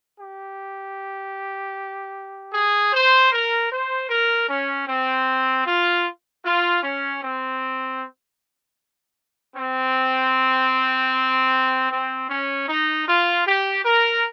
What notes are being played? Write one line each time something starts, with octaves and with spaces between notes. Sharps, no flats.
G4
G#4
C5
A#4
C5
A#4
C#4
C4
F4
F4
C#4
C4
C4
C4
C#4
D#4
F4
G4
A#4